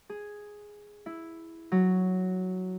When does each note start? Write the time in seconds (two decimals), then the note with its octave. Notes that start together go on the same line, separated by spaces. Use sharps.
0.10 G#4
1.06 E4
1.72 F#3